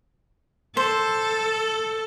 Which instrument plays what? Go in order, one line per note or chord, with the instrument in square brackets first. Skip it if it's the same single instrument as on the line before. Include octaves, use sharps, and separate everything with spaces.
[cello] A4 [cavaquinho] C5